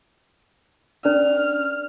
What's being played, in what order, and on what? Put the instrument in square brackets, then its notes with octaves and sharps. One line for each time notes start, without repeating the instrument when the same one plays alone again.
[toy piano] C#4 D4 A#4 [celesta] D5 [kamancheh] F6